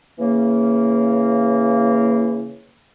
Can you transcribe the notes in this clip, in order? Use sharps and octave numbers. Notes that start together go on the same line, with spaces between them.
C#3 E3 A#3